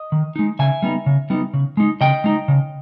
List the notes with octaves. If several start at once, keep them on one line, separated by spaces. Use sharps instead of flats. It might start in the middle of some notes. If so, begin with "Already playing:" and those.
Already playing: D#5
D#3
G#3 D#4
C#3 E5 G#5
G3 B3 D#4
C#3
G3 B3 D#4
C#3
G#3 D#4
C#3 D#5 G5
G#3 D#4
C#3